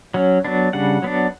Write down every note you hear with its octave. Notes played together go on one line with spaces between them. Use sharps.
F#3 C#4
F#3 B3 D4
C#3 G3 D4 F#5
F#3 B3 D4